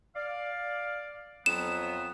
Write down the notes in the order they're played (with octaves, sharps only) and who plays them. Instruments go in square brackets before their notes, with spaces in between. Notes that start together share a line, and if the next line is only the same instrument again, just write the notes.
[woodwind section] D5 F5
[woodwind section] F2 F#3 B3 [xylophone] E7